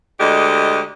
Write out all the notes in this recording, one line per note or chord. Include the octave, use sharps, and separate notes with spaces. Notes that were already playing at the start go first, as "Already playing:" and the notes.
D2 D3 G#3 G4 D#5